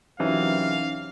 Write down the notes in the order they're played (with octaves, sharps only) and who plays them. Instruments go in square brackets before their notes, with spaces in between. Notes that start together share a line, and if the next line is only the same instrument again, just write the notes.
[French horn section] F#2 C3 F#3 [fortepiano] E3 [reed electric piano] C#4 D#4 [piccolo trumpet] F5